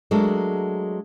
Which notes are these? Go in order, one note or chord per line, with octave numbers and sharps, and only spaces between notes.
F#3 G#3 A3 D4 A4 A#4